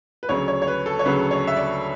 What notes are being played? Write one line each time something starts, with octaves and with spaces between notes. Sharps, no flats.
B4
D2 C#3 F#3 C#5
C#5
C#5
B4
A4
C#5
D2 C#3 F#3 B4
C#5
E5
D5